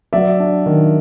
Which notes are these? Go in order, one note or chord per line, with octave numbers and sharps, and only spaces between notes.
F#3 D5 E5
D4
D#3